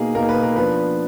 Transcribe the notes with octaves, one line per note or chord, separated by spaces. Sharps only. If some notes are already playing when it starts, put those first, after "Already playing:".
Already playing: B2 A#3 D#4 G#4
B2 A#3 D#4 A#4
B4
A#4
F3 B3 D4 B4